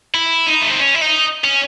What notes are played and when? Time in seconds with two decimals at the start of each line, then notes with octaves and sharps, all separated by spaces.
0.14 E4
0.47 D#4
0.62 A3
0.70 C4
0.80 C#4
0.95 E4
1.02 D#4
1.44 C#4